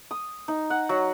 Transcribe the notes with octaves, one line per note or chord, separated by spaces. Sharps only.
D#6
D#4
F#5
F#3